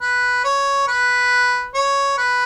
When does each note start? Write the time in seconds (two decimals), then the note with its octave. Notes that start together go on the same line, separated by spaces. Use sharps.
0.01 B4
0.44 C#5
0.88 B4
1.75 C#5
2.18 B4